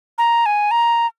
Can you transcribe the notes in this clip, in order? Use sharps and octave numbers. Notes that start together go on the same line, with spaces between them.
A#5
G#5
A#5